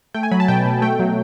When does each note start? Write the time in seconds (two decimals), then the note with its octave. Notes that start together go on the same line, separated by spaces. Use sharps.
0.14 A3 G5
0.23 G#5
0.31 F#3 B5
0.40 A5
0.48 B2 G5
0.65 B2
0.82 A3 G5
0.99 F#3